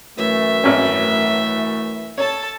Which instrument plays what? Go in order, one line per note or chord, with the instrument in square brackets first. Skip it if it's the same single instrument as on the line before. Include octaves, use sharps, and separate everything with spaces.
[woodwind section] F#2 E3 A3 [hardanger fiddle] E5
[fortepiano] G#1 C#4
[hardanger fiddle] A4 A5 [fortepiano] C#5